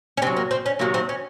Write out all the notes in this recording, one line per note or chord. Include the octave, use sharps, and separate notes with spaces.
C#4
C3 F#3 C4
A#3
C4
C#4
C3 D#3 F#3 A#3
C4
C#4